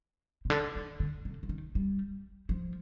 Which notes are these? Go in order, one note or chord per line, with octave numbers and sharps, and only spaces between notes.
C3
D3
D#3
D3
C3
D3
D#3
G3
F3